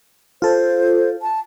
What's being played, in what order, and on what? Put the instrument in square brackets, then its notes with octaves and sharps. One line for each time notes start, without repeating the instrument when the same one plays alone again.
[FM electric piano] F4 A4 [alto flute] C5
[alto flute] A5